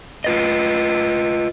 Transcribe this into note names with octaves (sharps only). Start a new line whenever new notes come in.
F4 B4 D#5